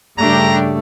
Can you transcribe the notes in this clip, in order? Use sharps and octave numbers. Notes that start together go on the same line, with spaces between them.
G2 C#3 A3 D4 G4 A#5